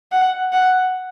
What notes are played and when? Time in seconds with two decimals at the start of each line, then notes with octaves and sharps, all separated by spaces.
0.12 F#5
0.52 F#5